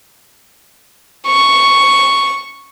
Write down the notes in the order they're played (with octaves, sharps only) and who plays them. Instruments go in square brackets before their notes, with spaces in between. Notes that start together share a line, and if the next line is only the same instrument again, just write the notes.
[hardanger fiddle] C#6